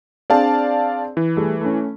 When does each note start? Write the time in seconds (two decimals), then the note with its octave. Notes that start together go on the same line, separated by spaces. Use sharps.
0.30 C4 D4 G#4 D5 F5 A5
1.17 E3
1.37 G3 A3 G#4
1.61 A3 C#4